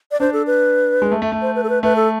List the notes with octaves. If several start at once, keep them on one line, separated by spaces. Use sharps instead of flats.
D5
D4 C5
A4
B4
G#3
A3
A3
A3
C5
B4
A4
B4
A3 B4
A4